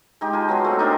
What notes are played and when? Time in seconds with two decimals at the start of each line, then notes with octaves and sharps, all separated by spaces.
0.21 G#3 D#4 G4
0.33 F4 G#5 A5
0.49 F#3 B3 G#4
0.64 A3 C4
0.79 D4 D#4 F4 A#4